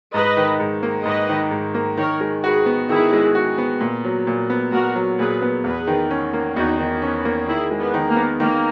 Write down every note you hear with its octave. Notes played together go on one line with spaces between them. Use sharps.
G#2 B4 D#5
D#3
G#2
A#3
G#2 B4 D#5
D#3
G#2
A#3
D#3 A#4 C#5
G#3
F#4 G#4 B4
B3
D#3 E4 G#4
G#3
F#4
B3
A#2
F#3
A#2
B3
A#2 F#4 A#4
F#3
A#2 G#4 B4
B3
E2 G#4 B4
D#3
C#4
A#3
E2 D#4 F#4
D#3
B3 C#4
A#3
D#3 E4 G#4
G#3
B3
D#3
A#3
B3
D#3 A#3